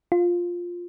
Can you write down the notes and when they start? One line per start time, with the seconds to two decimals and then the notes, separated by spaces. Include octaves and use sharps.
0.12 F4